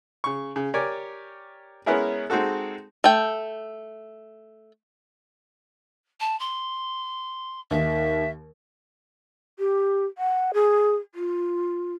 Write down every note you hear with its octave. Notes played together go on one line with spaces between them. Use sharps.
C#3 C#6
C#3
G4 A#4 C#5 D5 G#5
G#3 B3 C#4 E4 G#4 A#4
G#3 C4 D#4 F#4 A4
A3 G5
A5
C6
D#2 D#3 E5
G4
F#5
G#4
F4